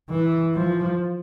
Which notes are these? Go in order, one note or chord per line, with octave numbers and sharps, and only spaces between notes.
E3
F3